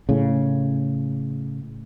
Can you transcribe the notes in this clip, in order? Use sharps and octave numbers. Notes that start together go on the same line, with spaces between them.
A2 C#3